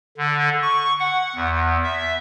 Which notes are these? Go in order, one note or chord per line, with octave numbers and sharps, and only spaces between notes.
D3
C#6
F#5
E2
E5